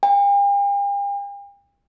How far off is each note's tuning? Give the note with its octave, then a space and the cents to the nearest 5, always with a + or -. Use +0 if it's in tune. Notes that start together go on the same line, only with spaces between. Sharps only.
G5 +45